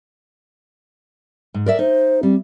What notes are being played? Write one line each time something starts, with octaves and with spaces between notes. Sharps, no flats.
G#2
A#4 D5 E5
D#4 C5
G3 C4